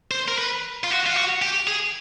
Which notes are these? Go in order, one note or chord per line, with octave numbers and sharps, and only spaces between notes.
C5
A#4
B4
F4
F#4
F4
F#4
G4
G#4